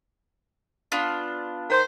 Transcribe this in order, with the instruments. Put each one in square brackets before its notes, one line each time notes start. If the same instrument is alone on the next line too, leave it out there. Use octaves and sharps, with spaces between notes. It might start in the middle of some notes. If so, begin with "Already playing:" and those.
[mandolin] B3 D4 F4
[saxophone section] D#3 C5